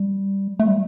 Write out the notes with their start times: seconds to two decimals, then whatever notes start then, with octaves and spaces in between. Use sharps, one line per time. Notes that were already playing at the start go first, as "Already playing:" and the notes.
Already playing: G3
0.59 A3
0.68 G3